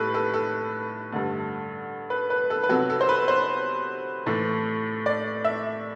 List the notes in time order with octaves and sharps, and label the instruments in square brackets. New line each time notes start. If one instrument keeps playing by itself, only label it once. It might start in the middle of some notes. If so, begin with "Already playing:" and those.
Already playing: [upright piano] A2 G3 A4 B4
A4
A4
G2 D3 A3
B4
B4
A4
B4
C3 F#3 B3 A4
A4
C5
B4
C5
A2 E3 A3
D5
E5